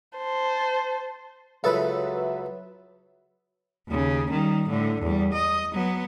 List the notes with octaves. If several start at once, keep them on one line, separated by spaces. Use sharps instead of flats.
C5 A5
C#2 F#3 A4 B4 E5
D#2 C#3
D#3 G3
A2 D3
E2 G3
D#5
F#3 B3